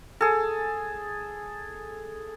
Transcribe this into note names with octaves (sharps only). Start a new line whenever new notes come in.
G#4 A4